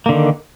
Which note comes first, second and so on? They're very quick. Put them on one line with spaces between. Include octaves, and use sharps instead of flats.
A#3 D3 D#3